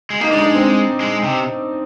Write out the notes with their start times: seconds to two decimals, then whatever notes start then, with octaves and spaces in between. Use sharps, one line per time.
0.10 G#3
0.20 A#3 D#4
0.32 G#3 D4
0.38 D#4
0.43 D4
0.55 C4
1.00 G#3
1.23 C3